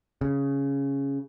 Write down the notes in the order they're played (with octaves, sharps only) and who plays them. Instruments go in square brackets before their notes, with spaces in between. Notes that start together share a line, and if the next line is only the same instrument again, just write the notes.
[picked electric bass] C#3